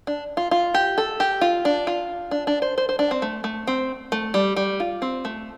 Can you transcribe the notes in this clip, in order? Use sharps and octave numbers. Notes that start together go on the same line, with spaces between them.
D4
F4
F4
G4
A4
G4
F4
D4
F4
D4
D4
C5
C5
C5
D4
C4
A3
A3
C4
A3
G3
G3
F4
C4
A3